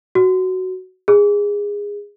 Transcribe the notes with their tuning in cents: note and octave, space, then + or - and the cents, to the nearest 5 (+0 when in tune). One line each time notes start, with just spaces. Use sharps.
F#4 +10
G#4 -20